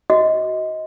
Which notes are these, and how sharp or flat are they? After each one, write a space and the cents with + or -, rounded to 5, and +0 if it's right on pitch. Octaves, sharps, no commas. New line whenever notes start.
F#4 +10 D#5 +20